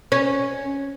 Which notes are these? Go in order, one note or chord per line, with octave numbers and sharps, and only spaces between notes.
C#4